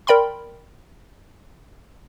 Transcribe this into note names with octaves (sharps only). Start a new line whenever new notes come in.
A#4 D5 G5 B5 C6